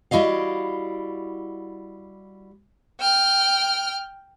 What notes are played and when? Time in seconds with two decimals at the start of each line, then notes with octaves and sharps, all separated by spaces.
0.11 G3 E4 F#4 D#5 F5
3.00 G5 F6